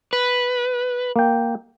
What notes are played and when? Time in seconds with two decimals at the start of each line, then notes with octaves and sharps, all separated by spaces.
0.13 B4
1.16 A#3 G5